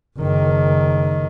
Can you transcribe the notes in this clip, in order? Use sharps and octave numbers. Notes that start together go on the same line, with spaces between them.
F#1 D#3